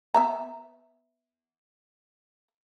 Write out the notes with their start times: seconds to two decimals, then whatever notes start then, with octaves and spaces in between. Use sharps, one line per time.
0.14 B3 E5 A#5